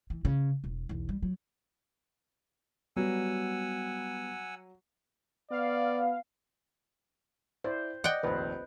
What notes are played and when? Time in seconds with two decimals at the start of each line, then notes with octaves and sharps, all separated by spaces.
0.10 E3
0.25 C#3
0.64 E1
0.89 B1 E2
1.09 G3
1.22 F#3
2.96 F#3 G3 B3 F#5 G#5 E6
5.51 B3 D5 F5
7.64 E4 C5 D5
8.04 D5 D#5 F#5 G5
8.23 F1 A#1 D#2 B4 C5